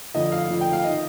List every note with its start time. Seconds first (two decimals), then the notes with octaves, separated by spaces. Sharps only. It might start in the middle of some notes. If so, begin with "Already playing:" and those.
0.14 F2 D3 F3 D#5
0.32 F5
0.50 F2 D3 F3
0.61 G5
0.73 F5
0.84 D#3 D#5